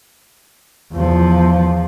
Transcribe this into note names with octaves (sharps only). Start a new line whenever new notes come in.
E2 F3